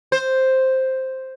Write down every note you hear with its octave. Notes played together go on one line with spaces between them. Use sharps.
C5